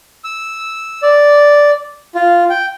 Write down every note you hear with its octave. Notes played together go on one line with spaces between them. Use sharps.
E6
D5
F4
G5